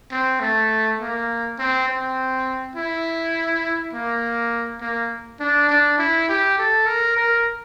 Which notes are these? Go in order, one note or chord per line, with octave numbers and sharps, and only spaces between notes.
C4
A3
A#3
C4
C4
E4
A#3
A#3
D4
D4
E4
G4
A4
A#4
A#4